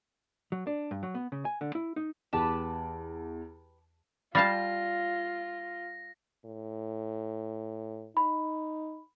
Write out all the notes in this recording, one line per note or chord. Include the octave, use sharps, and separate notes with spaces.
F#3
D4
G2
F#3
B3
C#3
G#5
D3
E4
D#4
E2 G4 B4 A5
G3 F4 F5 A5 B5 A6 A#6
A2
D#4 B5